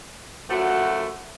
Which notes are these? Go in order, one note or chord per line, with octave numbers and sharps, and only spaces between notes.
F#2 F3 A3 F#4 F#5